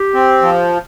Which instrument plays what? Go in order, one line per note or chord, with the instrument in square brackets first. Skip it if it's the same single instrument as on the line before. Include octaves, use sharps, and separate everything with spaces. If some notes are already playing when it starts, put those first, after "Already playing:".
Already playing: [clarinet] G4
[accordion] C4
F3